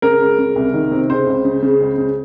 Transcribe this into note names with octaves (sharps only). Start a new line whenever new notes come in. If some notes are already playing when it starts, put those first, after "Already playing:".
C#3 A#4
C#2
C#3
C2
D#3
C3
C#3 C5
C#2
C#3
C#3
C#2
C#3